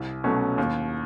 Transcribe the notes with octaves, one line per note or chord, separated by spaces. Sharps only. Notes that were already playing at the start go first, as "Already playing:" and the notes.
Already playing: C2
B2 F#3 A3 C#4
D#2